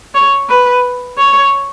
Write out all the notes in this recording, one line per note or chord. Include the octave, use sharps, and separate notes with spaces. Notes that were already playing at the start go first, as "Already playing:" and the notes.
C#5
B4
C#5